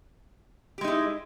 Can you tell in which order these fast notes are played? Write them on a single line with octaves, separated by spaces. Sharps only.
G4 G#3 D#4 E4